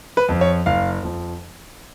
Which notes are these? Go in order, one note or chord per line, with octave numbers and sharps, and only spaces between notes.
B4
F2 F3
C#5
F#1 F5
F2 F3